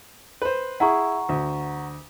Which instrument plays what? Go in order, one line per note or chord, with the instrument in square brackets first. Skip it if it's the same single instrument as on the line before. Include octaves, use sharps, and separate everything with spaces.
[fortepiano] B4 C5
[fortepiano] E4 G#4 [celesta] F#5 A#5 C#6
[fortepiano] D2